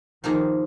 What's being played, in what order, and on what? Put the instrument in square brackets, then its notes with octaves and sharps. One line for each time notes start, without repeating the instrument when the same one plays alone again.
[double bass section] D#3 [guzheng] F3 A#3 D#4 G#4